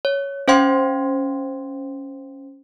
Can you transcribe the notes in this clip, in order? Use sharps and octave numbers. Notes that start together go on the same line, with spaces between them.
C#5
C#4 C5 F5 G5 C6 G#6